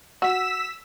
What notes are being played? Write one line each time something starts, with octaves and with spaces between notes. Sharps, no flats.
F#4 E6 B6 E7